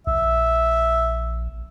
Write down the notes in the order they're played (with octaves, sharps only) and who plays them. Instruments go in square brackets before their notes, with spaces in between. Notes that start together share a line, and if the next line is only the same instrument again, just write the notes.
[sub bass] A#1 [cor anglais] E5